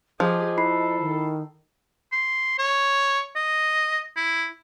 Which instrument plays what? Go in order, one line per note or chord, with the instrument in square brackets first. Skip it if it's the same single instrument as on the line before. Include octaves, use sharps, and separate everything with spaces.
[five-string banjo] F3 [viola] G4 G#4 [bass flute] D#5
[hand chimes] E4 B5 C7 [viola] A4
[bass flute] D#3
[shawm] C6
C#5
D#5
E4